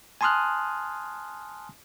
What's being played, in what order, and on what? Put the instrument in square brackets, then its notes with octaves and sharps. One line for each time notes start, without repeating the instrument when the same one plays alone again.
[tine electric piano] G#5 A5 C6 D#6 F6 F#6